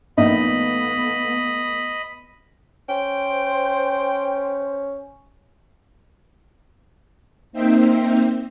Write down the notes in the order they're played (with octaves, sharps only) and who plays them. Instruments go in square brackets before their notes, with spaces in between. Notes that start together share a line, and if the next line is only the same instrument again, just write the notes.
[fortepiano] A#1 D#4 [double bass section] A3 B3 [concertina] D#5 B5
[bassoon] C#4 [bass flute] C5 [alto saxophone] G5
[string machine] A#3 C4 D#4 C5 E5 G5